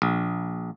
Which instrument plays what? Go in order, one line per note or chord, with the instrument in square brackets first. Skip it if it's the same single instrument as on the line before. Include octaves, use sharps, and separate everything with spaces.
[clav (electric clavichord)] A#1